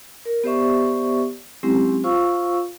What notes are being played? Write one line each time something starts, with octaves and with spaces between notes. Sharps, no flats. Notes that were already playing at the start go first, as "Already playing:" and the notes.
A#4
B3 G4 C5 D5 E5 C#6
F#3 G#3 C4 C#4 E4 G4
F4 C5 F5 C#6 E6